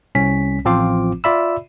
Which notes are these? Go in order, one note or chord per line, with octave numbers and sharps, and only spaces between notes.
C2 C#4 B6
A1 F3 C4 F4 D6
F4 D5 E5 B5 E6